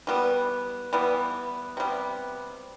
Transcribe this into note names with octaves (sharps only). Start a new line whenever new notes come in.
E3 G3 B3
E3 G3 B3
C3 G3 B3